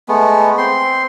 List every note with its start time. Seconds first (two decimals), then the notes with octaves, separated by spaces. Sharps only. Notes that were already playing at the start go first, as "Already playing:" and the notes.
0.08 G#3 A3 B3
0.58 C4 C6